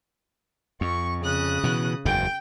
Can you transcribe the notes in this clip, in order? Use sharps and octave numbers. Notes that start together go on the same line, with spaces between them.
F2 C#6
C#3 D#6 F#6
B2 E3
F#1 E2 G#2 G5